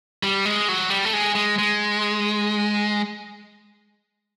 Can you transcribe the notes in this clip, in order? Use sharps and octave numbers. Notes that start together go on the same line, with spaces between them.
G3
G#3
F#3
G3
A3
G#3
G#3
G#3